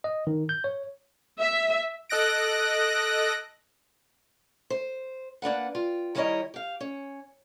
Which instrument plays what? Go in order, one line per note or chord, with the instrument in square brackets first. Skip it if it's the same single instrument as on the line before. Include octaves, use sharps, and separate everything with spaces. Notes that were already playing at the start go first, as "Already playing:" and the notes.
[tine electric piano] D#5
D#3
G6
C#5
[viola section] E5
[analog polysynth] A4 D#5 F#6 A#6 D7
[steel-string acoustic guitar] C5
A#3 D4 B4 F#5
F4 G5
D#3 G3 E4 A#4 C#5 D#5
G4 F5
C#4